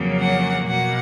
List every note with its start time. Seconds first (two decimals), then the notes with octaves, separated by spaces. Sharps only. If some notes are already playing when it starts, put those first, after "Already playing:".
Already playing: F2 C#3 F#3 A#3
0.19 F#5
0.67 B2 A#3 F#5